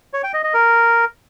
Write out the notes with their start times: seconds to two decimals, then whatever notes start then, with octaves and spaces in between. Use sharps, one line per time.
0.13 C#5
0.23 G5
0.34 D#5
0.44 D#5
0.54 A#4